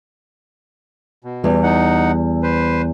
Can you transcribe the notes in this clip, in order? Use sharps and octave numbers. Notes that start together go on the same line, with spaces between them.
B2
E2 G3
D#4 F#5
B4 C5